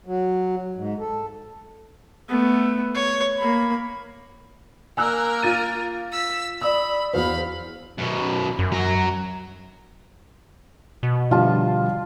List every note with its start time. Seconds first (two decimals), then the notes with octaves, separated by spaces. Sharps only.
0.06 F#3
0.76 G#2
0.99 A4
2.29 A3 B3
2.94 C#5
3.38 A#3 B5
4.97 A#3 A#4 G#5 E6 F#6
5.42 F4 A6 D#7
6.12 E6 B6
6.61 D5 B5 D#6 E6
7.13 E2 F#4 C5 F5 B5
7.98 F#2 B2
8.59 F#2
8.72 F#3 A#5
11.03 B2
11.31 D3 F3 G3 F4 A5